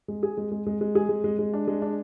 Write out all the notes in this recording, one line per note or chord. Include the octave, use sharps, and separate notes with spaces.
G#3
G#4
G#3
G#3
G#3
G#3
G#4
G#3
G#3
G#3
D4
G#3
D4